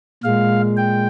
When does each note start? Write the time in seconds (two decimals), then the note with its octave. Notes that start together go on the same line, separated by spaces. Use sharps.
0.24 A#2 G#3 F5
0.77 G5